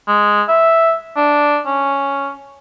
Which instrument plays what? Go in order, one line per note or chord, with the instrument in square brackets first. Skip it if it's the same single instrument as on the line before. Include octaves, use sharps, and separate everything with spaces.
[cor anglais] G#3
E5
D4
C#4